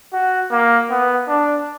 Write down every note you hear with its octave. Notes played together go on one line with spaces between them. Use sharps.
F#4
A#3
B3
D4